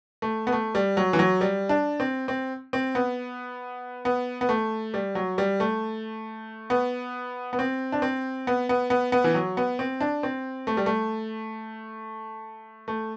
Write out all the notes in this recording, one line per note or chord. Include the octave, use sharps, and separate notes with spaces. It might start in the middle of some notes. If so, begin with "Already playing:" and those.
A3
B3
A3
G3
F#3
E3
F#3
G3
D4
C4
C4
C4
B3
B3
B3
A3
G3
F#3
G3
A3
B3
B3
C4
D4
C4
B3
B3
B3
B3
E3
F#3
B3
C4
D4
C4
A3
G3
A3
A3